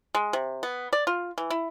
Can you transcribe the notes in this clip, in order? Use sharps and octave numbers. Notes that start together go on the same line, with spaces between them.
G#3
C3
B3
D5
F4
E3
E4